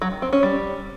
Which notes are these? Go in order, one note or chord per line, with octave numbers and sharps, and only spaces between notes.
F#3
D#3
C4
C#4
G3